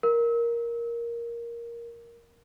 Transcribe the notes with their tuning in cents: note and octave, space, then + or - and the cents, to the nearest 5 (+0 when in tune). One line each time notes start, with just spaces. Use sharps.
A#4 +5